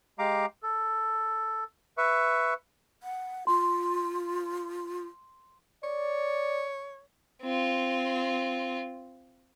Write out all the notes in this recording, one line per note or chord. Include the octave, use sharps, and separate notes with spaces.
G#3 G4 F5 A#5 D6
A4
B4 E5 C#6
F#5
F4 C6
C#5 D5
C4 F4